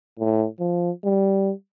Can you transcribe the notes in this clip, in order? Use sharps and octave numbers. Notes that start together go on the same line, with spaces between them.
A2
F3
G3